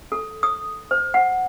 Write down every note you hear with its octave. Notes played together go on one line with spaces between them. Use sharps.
A4
D#6
C5
F#5